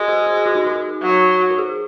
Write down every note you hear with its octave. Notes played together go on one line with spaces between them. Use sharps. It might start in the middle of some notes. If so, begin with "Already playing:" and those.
Already playing: G#3 F#4
G#4
G#4
F#4
D#4
F#4
F#3
F#4
G#4